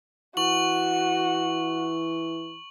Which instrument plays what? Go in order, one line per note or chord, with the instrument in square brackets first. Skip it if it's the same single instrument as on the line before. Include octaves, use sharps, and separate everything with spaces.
[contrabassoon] E3 [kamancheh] F#4 [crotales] C#6 F#7